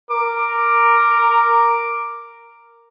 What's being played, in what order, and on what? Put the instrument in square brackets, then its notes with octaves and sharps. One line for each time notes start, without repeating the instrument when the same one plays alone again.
[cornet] A#4 [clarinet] D6